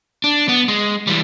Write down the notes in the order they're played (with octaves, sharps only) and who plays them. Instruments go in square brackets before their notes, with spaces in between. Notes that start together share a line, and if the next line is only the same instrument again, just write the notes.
[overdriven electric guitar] D4
B3
G#3
E3 G3